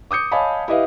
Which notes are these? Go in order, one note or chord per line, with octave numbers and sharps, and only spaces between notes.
D6 D#6 G6 C#7
C#5 D#5 F5 G#5 A5 B5
E4 G4 B4 D#5 F5